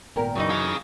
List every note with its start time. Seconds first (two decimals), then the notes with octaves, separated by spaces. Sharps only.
0.16 G#1 A#2 B3 G4 A#4
0.35 F#2 C#3 E3 F#3 D#4
0.50 F#4 G#4 F5